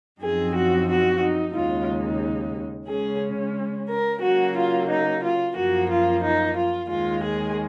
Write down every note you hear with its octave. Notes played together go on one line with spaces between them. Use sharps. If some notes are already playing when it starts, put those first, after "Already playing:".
F#2 F3 C4 D#4 G#4
F#4
F#4
D#4
D#2 C#3 G#3 D#4 F4
C#3 G#3 C#4 G#4
A#4
C#3 F#3 A#3 F#4
F4
D#4
F4
F#2 F3 A#3 F#4
F4
D#4
F4
D#2 D#3 G#3 F4
G#4